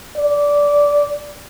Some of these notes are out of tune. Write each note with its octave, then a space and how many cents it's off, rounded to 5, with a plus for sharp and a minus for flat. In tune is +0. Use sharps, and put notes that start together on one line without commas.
D5 -15